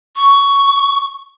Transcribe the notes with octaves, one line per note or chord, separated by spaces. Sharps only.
C#6